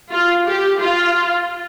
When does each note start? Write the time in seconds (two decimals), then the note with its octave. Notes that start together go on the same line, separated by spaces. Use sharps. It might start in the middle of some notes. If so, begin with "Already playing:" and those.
0.11 F4
0.47 G4
0.81 F4